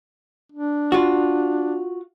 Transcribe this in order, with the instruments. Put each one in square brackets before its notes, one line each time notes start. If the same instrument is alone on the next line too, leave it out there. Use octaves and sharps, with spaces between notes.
[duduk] D4
[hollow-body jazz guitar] F4 F#4